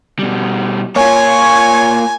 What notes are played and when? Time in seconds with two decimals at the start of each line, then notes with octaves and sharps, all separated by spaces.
0.19 B2 G3
0.96 A#3 F4 C#5 G#5